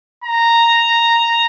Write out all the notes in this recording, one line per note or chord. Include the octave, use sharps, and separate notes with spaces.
A#5